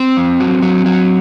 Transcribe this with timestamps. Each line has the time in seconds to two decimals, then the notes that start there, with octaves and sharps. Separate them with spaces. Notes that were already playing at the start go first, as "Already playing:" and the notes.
Already playing: C4
0.17 F2
0.40 F#3
0.63 F#3
0.86 F#3